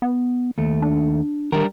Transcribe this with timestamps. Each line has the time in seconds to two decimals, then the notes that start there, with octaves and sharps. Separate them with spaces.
0.02 B3
0.58 D#2 A3
0.82 D4
1.52 D#3 G3 D4 A#4